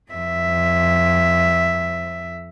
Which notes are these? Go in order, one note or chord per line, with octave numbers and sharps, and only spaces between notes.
F2 E5